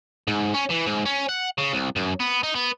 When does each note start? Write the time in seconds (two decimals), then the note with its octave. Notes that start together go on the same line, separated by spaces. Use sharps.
0.27 G#2
0.55 C#4
0.71 E3
0.87 G#2
1.06 C#4
1.29 F#5
1.58 C#3
1.73 C2
1.96 F#2
2.20 B3
2.43 D#4
2.55 B3